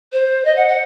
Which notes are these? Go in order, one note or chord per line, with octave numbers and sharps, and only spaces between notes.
C5
D#5
F#5
F#5